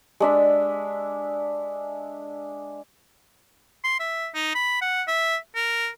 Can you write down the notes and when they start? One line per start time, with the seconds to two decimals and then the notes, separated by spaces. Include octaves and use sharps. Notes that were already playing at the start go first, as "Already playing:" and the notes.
0.20 G#3 D4 E5
3.84 C6
4.00 E5
4.35 D#4
4.55 B5
4.81 F#5
5.08 E5
5.55 A#4